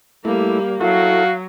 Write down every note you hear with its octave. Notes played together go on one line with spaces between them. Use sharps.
G3 A3 A#3 E4
F#3 E4 F#4 A4 F5